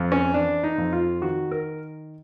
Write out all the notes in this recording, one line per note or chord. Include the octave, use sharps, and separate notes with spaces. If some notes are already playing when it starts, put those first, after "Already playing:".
Already playing: F2
C#4
E3 D4
D#4
F2
F4
D#3 F#4
A#4